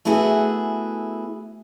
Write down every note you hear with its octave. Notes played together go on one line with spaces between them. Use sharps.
A3 B3 E4 F#4 G#4